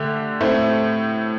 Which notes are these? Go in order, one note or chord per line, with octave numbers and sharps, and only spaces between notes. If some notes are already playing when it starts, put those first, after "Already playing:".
Already playing: D3 A3 G4
A2 A3 C4